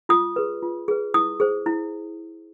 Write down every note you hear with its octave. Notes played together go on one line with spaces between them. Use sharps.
F4 D#6
G#4 B4
F4
G#4 B4
E4 D#6
G#4 C5
E4